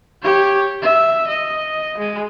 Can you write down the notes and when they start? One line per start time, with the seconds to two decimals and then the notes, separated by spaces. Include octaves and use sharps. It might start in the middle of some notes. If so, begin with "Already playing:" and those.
0.22 G4 C#5
0.82 E5
1.28 D#5
1.98 G#3